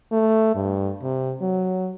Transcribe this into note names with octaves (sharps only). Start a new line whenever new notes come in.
A3
G2
C3
F#3